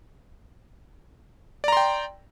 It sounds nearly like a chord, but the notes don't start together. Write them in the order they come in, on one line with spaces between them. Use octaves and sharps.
D5 A#5 C6 G5